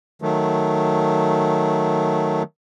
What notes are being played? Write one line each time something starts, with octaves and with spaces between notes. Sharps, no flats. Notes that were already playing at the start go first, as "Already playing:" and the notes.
D#3 F#3 A3